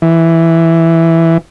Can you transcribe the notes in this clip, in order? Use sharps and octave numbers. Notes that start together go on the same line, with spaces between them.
E3